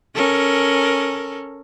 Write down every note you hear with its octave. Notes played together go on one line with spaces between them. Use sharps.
C#4 A4 A#4